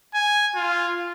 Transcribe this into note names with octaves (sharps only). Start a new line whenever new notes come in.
G#5
F4